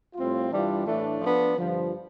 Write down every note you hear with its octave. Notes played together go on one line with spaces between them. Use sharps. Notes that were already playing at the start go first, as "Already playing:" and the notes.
A2 G3 C4 F4
G2 E3 G3 D4 F4
A2 E3 A3 D4
F3 B3 D4
G2 D3 F3